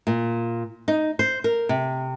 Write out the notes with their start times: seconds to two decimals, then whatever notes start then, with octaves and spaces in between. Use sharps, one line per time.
0.07 A#2
0.88 D#4
1.19 C5
1.44 A#4
1.69 C3